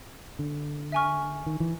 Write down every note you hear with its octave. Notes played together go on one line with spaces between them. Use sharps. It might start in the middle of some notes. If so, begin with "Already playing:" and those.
D3
E5 G#5 C#6 F6
D#3
E3